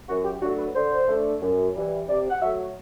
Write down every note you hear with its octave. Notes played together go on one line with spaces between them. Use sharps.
F#2 F#4
G4
F#3 A3 D4 F#4
B4
D3 C5
A3 D4
F#2
E3 G3
C3 D5
F#5
F#3 A3 E5